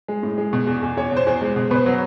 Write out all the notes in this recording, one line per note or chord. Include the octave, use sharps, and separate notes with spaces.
G#3
A2
G#3
B2
E2
E2
E2 C#5
B2 C5
E2
G#3
B2
B2 B4 C5
F#3